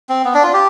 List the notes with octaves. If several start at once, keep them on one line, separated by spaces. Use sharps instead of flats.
C4
B3
D4
F4
G4